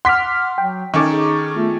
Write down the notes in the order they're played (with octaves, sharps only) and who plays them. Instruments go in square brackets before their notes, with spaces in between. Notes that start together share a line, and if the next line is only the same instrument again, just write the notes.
[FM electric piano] F#5 D6 F6 [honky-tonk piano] C6 B6
[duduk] F#3 [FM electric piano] G5
[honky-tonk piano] D#3 C#4 A4 [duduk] D#4 [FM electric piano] C#6 D6
[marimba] G#4
[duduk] A3 [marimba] B3 F4